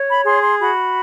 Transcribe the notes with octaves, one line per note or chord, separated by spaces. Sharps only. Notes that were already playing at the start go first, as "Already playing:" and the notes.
Already playing: C#5
B5
G#4 C6
C6
F#4 B5